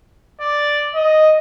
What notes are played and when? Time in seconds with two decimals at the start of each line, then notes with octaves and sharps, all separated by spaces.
0.41 D5
0.95 D#5